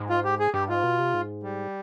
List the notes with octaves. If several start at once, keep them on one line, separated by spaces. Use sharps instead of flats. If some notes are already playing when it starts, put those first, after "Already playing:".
Already playing: G#2
F4
G4
G#4
G2 G4
G#2 F4
B2
C3
G#2
G3